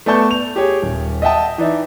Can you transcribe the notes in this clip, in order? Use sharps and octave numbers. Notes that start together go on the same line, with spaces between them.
A3 B3 D5 A5 C#6 G6
F7
G4 G#4 C#5
D#1
D#5 E5 F#5 G5 A5 D#6
E3 D#4 D5 E5